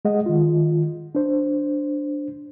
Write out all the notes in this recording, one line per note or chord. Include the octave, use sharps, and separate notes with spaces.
G#3 G#4 D#5 F#5
D#3 F4
D4 C5